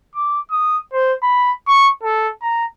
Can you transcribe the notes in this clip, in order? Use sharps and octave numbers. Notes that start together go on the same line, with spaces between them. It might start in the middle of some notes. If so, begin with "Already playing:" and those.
D6
D#6
C5
B5
C#6
A4
A#5